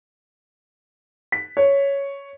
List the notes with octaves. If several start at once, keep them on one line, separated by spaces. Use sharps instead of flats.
B6
C#5